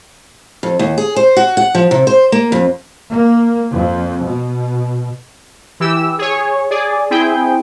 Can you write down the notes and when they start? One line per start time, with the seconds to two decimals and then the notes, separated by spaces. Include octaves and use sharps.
0.63 F2
0.79 D#2
0.98 G#4
1.16 C5
1.37 F#4
1.57 F#5
1.75 F3
1.91 C3
2.07 C5
2.32 A#3
2.52 F2
3.10 A#3
3.73 F2
4.23 B2
5.80 E3 G4 E6
6.18 G#4 C#5
6.71 G#4 D5
7.10 C4 E4 G#4 G5